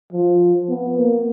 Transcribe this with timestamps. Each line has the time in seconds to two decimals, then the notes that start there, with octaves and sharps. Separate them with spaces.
0.12 F3
0.69 B3
0.98 A#3